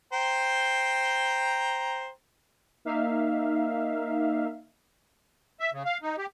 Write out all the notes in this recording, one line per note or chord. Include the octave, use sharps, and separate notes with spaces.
C5 G5 A#5
A#3 D#4 E5 F5
E5
C#3
F5
D#4
G4